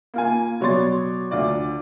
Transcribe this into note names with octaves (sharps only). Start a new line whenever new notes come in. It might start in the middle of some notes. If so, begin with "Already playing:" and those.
A#3 F4 G#5
B2 F#3 C#5 D5 C6 A6
D2 F4 D5